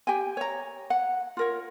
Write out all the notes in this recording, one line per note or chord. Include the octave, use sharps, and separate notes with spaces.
G4 G5 G#5
C#5 A#5
F#5
F4 A#4 C#5